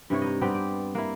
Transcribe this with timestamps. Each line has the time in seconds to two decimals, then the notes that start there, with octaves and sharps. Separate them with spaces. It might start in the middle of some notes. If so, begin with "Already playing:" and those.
0.10 G2 C3 E4 C#5
0.22 D#4 D#5
0.41 G3 B3 C4 G4
0.55 D5
0.95 A#3 E4